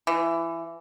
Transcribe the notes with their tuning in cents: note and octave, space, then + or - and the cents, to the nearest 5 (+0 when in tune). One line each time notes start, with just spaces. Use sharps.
E3 +20